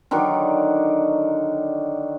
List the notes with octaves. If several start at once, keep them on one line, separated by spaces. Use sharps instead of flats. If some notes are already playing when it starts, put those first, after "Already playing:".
D3 D#3 F#3 D4